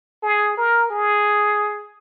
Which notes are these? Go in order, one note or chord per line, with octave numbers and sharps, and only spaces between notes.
G#4
A#4
G#4